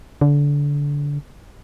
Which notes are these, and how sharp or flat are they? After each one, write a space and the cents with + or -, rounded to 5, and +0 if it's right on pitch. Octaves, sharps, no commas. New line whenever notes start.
D3 -25